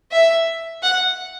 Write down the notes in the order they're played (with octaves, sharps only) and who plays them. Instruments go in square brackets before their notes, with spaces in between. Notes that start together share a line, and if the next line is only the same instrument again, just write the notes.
[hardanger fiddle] E5
F#5